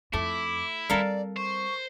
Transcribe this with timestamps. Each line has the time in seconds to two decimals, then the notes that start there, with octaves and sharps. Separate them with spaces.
0.13 F2 A3 E4 D6
0.90 G3 C4 A4 A#4 D5 F5
1.37 C5 C#6